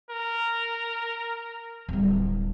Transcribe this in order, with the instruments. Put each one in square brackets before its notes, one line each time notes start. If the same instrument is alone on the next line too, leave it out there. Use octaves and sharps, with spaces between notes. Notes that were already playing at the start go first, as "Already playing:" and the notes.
[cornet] A#4
[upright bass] D1 G3